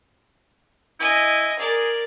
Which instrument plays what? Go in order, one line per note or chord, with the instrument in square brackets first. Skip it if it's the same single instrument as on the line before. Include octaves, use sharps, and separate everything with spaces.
[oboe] E4 [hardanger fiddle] D#5 G#5
[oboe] G#4 [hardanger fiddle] A#4 D5